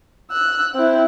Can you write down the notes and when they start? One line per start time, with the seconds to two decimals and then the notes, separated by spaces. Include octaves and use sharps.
0.31 E6 F#6
0.75 C4 E4